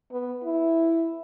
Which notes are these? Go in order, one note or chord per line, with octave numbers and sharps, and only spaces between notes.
B3
E4